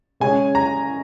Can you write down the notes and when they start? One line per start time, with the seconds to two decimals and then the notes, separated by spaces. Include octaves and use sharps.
0.20 C#3 G#3 C#4 G#5
0.55 A#5